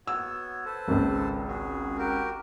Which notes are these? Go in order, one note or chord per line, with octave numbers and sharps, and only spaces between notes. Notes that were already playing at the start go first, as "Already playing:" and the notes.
B3 F#4 C#5 E6
A4 B4 C5
G#1 C#2
F#4 G#4
F#4 G4 A#4